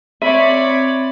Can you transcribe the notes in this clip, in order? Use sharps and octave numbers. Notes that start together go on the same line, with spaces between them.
C4 C#5 D5 E5 B5